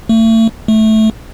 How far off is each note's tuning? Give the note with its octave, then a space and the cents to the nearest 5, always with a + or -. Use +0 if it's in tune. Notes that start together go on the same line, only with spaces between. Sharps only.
A3 +35
A3 -10